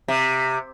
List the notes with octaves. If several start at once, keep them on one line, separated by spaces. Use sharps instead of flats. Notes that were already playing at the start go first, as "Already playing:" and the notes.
C3